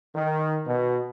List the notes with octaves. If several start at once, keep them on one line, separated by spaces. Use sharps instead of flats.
D#3
B2